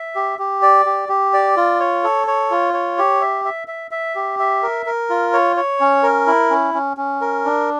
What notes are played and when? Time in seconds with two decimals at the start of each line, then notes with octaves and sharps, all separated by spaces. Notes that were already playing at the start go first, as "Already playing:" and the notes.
Already playing: E5
0.15 G4
0.39 G4
0.62 D5
0.86 G4
1.09 G4
1.34 D5
1.57 F4
1.80 C#5
2.04 A4
2.27 C#5
2.51 F4
2.74 C#5
2.98 G4
3.21 E5
3.45 E5
3.68 E5
3.91 E5
4.15 G4
4.39 E5
4.63 A#4
4.86 A#4
5.10 F4
5.33 C#5
5.56 C#5
5.80 C#4
6.03 A#4
6.27 E4
6.50 C#4
6.74 C#4
6.97 C#4
7.21 A#4
7.45 D4